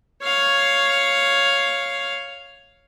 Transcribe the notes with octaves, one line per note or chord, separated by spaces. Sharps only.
C#5 F5